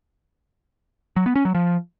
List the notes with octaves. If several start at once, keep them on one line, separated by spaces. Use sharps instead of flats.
F#3
B3
C#4
F#3
F3